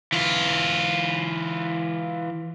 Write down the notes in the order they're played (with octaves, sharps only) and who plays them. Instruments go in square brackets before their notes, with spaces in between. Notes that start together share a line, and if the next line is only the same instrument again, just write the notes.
[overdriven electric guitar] E3 F4